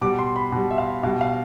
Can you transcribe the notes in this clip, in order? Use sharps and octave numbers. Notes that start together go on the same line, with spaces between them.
B2 G3 D6
C6
B5
B2 G3
E5
F5
B2 G3 F5
F5